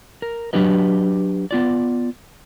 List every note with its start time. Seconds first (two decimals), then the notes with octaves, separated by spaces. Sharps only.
0.22 A#4
0.53 F#3 D4 G4 B4 D#5
1.51 B3 F4 D5